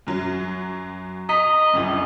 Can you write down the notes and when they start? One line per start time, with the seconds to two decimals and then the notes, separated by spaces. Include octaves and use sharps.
0.07 F#2 F#3
1.29 D#5 A#5 B6
1.73 G1 C#2 F#2